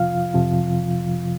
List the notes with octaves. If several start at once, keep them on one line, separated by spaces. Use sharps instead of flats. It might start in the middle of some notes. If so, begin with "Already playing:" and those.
Already playing: F2 C3 F3 F4 F5
F2 C3 F3